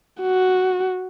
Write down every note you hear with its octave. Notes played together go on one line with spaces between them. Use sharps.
F#4